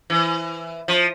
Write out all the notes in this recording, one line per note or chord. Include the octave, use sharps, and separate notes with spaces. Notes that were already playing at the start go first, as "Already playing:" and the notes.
E3
F3